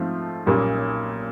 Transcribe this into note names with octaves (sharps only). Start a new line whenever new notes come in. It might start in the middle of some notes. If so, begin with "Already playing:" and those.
Already playing: G#2 F3 A3 C4 F4
B1 A#2 G3 A#3 C#4